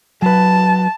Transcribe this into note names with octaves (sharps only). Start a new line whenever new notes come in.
F#3 B4 A5